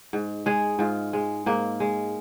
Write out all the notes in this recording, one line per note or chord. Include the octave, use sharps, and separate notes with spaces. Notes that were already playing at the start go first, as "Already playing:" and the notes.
G#2
G#3 G#4
G#2 F4
G#3
G#2 A#3
G#3